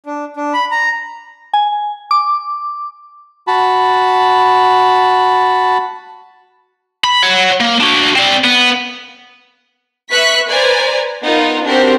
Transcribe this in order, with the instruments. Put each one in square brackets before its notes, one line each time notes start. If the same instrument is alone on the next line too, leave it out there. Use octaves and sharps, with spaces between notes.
[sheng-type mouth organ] D4
D4
B5
A#5
[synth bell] G#5
D6
[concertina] F#4 A5 B5
[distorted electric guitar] B5
C#5 F#5
A#3
D4 F#4
C4 D5
B3
[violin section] B4 E5 C#6 F#6 B6
B4 C5 D5 G#5 A#5
B3 D#4 F4 A#4
C4 D4 F#4 G4 A#4 C5